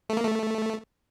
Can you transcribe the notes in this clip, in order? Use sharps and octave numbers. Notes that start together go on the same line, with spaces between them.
A3
A#3
A3